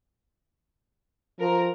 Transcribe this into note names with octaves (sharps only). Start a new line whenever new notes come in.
F3 A#4